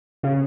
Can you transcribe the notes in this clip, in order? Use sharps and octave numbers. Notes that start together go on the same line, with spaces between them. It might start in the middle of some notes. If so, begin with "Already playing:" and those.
C#3